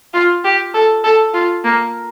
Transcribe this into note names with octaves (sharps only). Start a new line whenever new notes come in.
F4
G4
A4
A4
F4
A#3